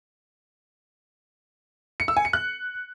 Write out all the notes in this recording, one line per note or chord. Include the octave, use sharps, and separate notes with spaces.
C#7
E6
G#5
C#7
F#6